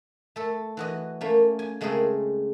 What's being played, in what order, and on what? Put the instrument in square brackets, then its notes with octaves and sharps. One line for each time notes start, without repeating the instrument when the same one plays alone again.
[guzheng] A3 A4
E3 F#4 D#5
A3 A#3 C#4
G#5
C#3 G#3 A3 C4 G#4 A#4